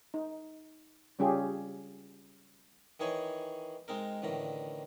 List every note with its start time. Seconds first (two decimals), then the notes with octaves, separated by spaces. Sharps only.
0.14 D#4
1.19 C#3 G3 C#4 F4 G4 G#4
3.00 D#3 E3 D#4 G#4 C#5 G#5
3.88 G#3 C4 D#4 A#4
4.22 A1 A2 D3 D#3 A#5